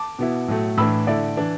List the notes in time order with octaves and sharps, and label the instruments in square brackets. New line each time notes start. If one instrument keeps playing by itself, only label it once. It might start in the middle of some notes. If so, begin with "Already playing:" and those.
Already playing: [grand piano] A5 D6
B2 B3 E4
A2 F#3 A3
A2 E3 D4 B5 E6
D3 A3 E4 D5
E3 D4